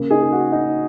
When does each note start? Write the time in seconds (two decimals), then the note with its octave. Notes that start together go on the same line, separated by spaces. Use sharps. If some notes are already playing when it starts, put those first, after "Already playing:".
Already playing: C#3 A#3
0.10 D#4 G#4
0.23 G#4
0.32 F#4
0.52 D#4